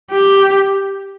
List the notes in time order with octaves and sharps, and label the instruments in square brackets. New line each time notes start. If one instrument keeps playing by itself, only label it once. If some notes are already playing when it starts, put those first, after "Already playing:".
[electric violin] G4